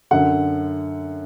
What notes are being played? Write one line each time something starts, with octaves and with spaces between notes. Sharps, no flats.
F#2 D3 F#5